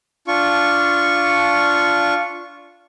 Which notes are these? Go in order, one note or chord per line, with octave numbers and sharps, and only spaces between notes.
D4 F4 C#6